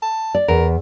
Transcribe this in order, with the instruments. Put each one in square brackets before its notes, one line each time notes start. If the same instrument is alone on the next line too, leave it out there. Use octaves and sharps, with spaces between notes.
[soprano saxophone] A5
[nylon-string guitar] D5
[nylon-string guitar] E2 [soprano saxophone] A#4